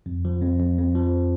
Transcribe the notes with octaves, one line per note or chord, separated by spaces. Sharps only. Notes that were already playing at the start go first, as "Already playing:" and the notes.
F2
F3
F2
F2
F2
F3